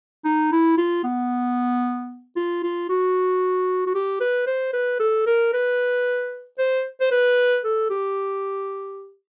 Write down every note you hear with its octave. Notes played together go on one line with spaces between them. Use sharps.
D#4
E4
F4
B3
F4
F4
F#4
F#4
G4
B4
C5
B4
A4
A#4
B4
C5
C5
B4
A4
G4